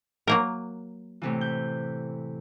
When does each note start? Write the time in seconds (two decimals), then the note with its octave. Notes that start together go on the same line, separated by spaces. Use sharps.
0.27 F#3 A#3 A#4
1.22 A2 C3 E3
1.41 G6